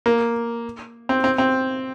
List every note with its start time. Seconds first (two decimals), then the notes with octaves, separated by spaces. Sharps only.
0.06 A#3
1.09 C4
1.24 C4
1.38 C4